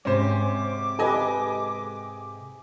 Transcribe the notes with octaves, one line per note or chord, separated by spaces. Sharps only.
G#2 C3 G#3 C#4 C5 D6
G4 A4 B4 D#5 G#5